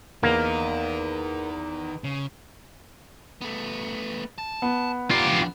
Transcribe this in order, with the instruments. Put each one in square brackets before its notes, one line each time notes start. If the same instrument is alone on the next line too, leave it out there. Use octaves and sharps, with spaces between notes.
[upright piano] E2 [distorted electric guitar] D#3 D#4 [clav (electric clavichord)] A#3
[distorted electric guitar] C#3
[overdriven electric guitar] A3 B3
A5
[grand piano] B3
[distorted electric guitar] F4 G4 [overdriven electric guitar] D5 A#5
[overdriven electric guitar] F3 D4